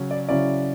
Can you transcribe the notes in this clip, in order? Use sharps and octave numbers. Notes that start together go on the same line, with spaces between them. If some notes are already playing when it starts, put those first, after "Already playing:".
Already playing: C#3 F#3 C#4
D5
C#3 F#3 C#4 E4 D5